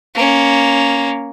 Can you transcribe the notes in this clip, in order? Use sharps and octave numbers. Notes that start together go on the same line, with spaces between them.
A#3 C#4